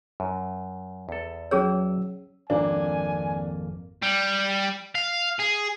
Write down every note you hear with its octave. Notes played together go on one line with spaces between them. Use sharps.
F#2
E2 A4
F#3 C#4 G#4 C#5 E6
G#1 F2 A#3 D4 G#5
G3
F5
G#4